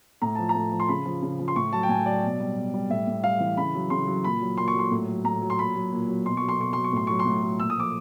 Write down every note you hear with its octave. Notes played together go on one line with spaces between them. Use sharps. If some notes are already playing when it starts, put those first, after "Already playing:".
A2 A#5
F3 A5
A#5
A2
F3
C6
C#3 B5
F3
C#3
F3
C6
A2 C#6
F#3 A5
G5
A2 G#5
F#3 D5
B2
G3
B2
G3
A2 E5
A2
G3 F5
E3
C#3 B5
F#3
C#3 C6
F#3
A#2 B5
F#3
A#2 C6
C#6
F#3 C6
A2
F#3
A2 A#5
F#3
C6
A#2 B5
F#3
A#2
F#3
B2 C6
F#3 C#6
C6
B2 C#6
F#3 C6
C#6
A2 C6
F#3 C#6
C6
A2
F#3
A#2 E6
D#6
F3 D6